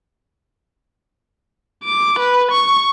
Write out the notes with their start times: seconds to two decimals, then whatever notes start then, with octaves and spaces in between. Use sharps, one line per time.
1.84 D6
2.19 B4
2.52 C#6